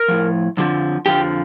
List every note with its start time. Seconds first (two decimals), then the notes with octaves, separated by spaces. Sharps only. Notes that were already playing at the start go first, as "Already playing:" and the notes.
Already playing: A#4
0.08 A2 F3
0.57 F2 D3 F3
1.06 F2 D3 F3 G4